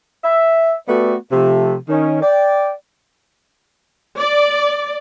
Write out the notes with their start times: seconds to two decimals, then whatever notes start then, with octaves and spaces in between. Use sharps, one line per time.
0.24 E5
0.88 A3 B3 F#4 G4 A4 D5
1.31 C3 F3 A3
1.89 D#3 C#4
2.22 D5 G5
4.18 D5